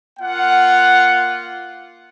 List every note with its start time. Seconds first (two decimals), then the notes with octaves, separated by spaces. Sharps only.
0.19 A#3 F4 F#5